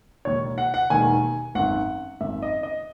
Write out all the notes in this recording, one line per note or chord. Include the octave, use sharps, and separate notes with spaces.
E1 D#2 D#3 C#5
F#5
F#5
E1 D#2 D#3 G#5
G#1 F#2 D#3 F#5
G#1 F#2 D#3 E5
D#5
D#5